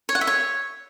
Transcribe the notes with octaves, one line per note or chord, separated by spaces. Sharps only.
C#5
F#5
E5
C#5